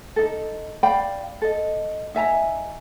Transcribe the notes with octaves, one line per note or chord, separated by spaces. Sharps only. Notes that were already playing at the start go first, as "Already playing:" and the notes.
D#4 A4
D5 F5 G5 B5
A4 D#5
D#4 E5 G#5 A#5